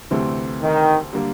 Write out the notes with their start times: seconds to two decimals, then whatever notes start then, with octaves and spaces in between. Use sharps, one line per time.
0.11 D2 C3 E3 A3 C4
0.62 D#3
1.13 D3 G3 A#3